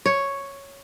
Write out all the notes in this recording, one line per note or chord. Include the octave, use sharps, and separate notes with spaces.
C#5